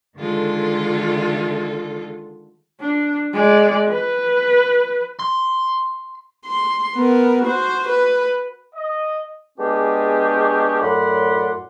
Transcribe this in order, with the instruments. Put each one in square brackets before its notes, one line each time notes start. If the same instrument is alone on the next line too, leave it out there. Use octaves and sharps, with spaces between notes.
[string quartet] D3 D#3 G#3 F4 A4
[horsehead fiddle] D4
G#3 D5
B4
[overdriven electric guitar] C6
[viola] C6
B3 A#4
F#4 C5
B4
[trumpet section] D#5
[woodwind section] G#3 B3 C#4 D4 G4 G#4
F#2 A2 D5 F#5 B5 C6